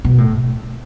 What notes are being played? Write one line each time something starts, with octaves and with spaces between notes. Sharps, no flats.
B2
A2